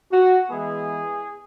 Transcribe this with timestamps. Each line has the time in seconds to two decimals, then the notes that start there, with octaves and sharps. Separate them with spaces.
0.12 F#4
0.50 E3 G#3 B3 E4 G#4